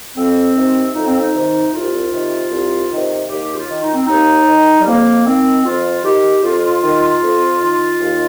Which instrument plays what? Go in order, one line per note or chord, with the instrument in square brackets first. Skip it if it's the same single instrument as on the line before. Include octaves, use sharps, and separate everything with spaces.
[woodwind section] F2 C4
C3 D#3
F2 D#4
C4
D#4
C3 D#3
C2 F4
C3 D#3
C2
C3 D#3
D#2 G4
F4
D#3
D#4
C4
D#2 D#4
D#3
G3
F2 A#3
D#3 C4
F2 F4
D#3 G4
F2 F4
D#3
F2
D#3
D#2